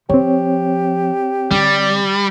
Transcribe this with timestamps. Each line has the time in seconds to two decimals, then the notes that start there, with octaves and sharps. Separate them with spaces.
0.09 F3 C4 G4 C#5
1.51 D3 G3